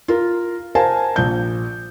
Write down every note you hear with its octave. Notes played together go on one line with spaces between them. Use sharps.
F4 A#4
A#4 C5 F5 G#5 A5
A#1 G6